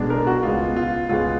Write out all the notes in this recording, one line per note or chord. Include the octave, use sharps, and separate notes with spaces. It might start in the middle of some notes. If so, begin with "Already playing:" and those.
Already playing: B1 B2 G#3 B3 D4
A#4
F#4
C#2 B2 G#3 B3 F4
F4
C#2 B2 G#3 B3 F4